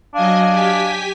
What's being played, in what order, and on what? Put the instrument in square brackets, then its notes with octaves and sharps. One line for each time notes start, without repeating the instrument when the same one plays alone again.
[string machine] F#3 D#5 G#5 [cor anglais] D4 [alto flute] F5
[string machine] G4 G#5 B6